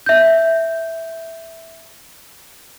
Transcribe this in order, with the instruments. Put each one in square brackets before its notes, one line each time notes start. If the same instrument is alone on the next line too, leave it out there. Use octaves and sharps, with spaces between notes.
[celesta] E5 G6